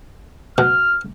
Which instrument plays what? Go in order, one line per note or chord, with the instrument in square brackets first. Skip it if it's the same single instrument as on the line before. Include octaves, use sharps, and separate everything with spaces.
[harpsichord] B2 [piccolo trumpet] F6